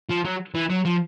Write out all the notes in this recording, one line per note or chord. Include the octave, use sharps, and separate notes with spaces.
F3
F#3
E3
F#3
F3